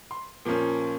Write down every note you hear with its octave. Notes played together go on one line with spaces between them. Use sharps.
C6
A#2 F3 A#3 C#4